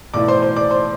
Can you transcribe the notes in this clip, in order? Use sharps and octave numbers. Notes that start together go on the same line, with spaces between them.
B1 A2 E3 D5 D6
C5 C6
C5 C6
D5 D6
C5 C6